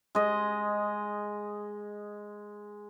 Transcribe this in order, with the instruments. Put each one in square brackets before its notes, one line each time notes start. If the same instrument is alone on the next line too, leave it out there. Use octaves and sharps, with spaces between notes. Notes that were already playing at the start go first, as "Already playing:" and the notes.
[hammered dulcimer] G#3 D#5